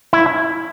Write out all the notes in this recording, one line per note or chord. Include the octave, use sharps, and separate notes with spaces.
E4